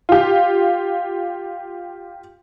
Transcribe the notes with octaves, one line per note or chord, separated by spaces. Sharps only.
F4 G4